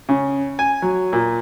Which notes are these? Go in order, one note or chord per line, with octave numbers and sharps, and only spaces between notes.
C#3
G#5
F#3
A#2